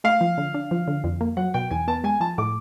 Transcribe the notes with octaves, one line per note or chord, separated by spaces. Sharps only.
A3 F5
F3
D3
D4
F3
D3
F2
A#3
F#3 F#5
B2 G5
E2 G#5
B3 A5
G#3 G#5
F3 A5
A2 D6